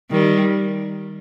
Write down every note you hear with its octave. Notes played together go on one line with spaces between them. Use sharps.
D#3 G3